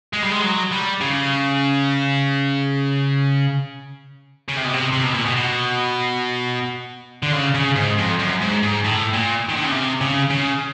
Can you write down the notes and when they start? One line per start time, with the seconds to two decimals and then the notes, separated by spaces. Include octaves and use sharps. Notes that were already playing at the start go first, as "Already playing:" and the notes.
0.13 G#3
0.22 G3
0.32 G#3
0.42 F#3
0.72 G3
1.01 C#3
4.49 C#3
4.57 C3
4.65 B2
4.74 C3
4.93 C3
5.03 B2
5.14 A#2
5.25 B2
5.36 B2
7.23 D3
7.33 C#3
7.55 C#3
7.76 G#2
7.98 F2
8.19 F#2
8.41 G#2
8.63 G#2
8.85 A2
9.14 A#2
9.49 D#3
9.57 D3
9.64 C#3
9.72 C3
10.01 C#3
10.31 C#3